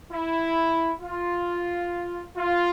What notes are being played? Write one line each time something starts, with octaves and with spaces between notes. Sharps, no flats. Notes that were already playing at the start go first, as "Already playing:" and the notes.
E4
F4
F4